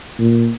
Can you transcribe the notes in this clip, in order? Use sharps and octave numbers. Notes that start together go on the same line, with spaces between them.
A#2